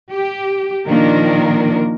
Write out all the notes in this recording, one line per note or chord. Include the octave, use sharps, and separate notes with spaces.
G4
A#2 D#3 F3 A#3 D4 A#4